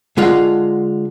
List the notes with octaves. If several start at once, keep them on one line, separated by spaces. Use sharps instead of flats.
D3 G#3 F4 F#5